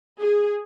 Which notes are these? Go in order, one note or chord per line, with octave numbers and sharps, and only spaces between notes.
G#4